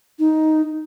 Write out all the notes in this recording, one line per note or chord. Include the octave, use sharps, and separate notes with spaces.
D#4